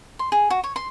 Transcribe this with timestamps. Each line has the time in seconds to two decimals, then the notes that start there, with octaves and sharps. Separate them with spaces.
0.19 C6
0.32 G#4
0.50 F#4
0.64 C#5
0.76 C6